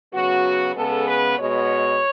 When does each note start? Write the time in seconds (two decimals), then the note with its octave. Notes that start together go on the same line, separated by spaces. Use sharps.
0.14 C#3 F#3 B3 F#4
0.76 C#3 G#3 B3 A4
1.07 B4
1.38 B2 G#3 B3 C#5